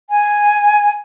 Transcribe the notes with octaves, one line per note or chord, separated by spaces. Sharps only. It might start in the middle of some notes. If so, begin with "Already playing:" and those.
G#5